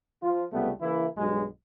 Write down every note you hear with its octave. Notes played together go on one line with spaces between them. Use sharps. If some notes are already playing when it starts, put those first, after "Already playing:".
F3 F4
C#2 C3 G3 A3 B3
C#3 E3 A#3 E4
B1 G2 F#3 G#3